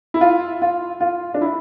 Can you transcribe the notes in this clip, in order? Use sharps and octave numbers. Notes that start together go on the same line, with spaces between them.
E4
F4
F4
F4
D4
E4